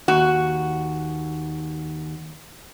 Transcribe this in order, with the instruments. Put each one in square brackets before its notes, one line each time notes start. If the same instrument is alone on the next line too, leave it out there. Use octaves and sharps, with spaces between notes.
[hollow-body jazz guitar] D#2 [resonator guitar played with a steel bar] F#4